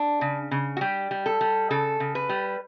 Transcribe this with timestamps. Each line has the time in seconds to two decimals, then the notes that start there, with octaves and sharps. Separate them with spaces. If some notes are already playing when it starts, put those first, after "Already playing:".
Already playing: D4
0.21 C#3
0.51 C#3
0.77 F#4
0.81 G3 G4
1.11 G3
1.26 A4
1.41 G3
1.70 C#3 A4
2.00 C#3
2.15 B4
2.29 G3